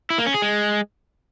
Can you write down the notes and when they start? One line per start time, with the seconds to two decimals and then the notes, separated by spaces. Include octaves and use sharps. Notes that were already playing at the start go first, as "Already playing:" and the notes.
0.10 E4
0.18 A#3
0.26 C#4
0.34 G#4
0.42 G#3